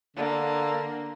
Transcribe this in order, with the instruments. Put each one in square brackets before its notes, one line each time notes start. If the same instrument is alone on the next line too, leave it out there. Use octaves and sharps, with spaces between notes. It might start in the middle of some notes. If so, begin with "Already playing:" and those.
[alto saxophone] D3 [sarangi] A#3